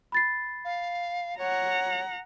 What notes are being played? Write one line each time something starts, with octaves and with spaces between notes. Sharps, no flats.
B5 A6 C7
F5
C#5 F#5 A#5